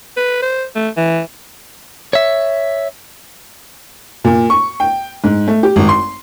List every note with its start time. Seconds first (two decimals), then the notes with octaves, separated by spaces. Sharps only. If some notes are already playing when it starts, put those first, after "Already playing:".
0.16 B4
0.42 C5
0.75 A3
0.97 E3
2.13 C#5 E5
4.24 A#2
4.50 C#6
4.80 G5
5.24 G#2
5.48 A3
5.63 G4
5.76 G#1
5.89 C6